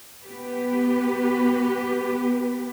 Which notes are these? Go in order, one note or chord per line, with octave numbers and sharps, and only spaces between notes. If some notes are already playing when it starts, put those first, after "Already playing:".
B3 G4 B4